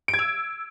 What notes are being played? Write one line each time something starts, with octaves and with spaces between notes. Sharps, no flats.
D7
G#6
E6